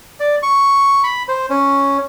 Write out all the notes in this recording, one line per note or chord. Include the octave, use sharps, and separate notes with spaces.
D5
C#6
B5
C5
C#4